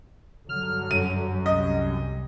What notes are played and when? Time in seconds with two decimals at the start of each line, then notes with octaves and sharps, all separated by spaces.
0.49 G2 D3 F#3 F6
0.91 F#2 D#7
1.46 C2 G3 D#5